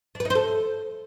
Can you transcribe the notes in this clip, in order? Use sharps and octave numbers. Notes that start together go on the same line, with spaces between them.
D4
B4
D#4
C5
A4